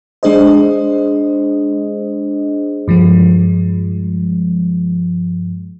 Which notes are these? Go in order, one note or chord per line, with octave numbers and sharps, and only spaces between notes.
G#3 D4 G#4 C5 D#5
G2 F3 G#3